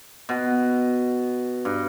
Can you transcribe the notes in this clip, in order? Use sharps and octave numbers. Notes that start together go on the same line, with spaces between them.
B2
G2